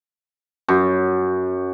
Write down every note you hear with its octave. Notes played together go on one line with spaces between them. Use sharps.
F#2